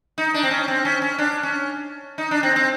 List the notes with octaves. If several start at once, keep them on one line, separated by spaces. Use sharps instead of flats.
D#4
D4
C4
C#4
C4
C#4
C#4
D4
C#4
D#4
D4
C4
C4